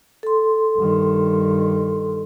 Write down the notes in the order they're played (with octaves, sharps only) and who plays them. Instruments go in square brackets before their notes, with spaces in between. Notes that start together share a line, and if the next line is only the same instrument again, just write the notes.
[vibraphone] A4 C6
[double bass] G2 D#3